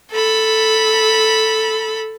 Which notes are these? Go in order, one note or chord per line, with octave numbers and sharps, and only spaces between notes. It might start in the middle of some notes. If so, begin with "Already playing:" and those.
A4 B5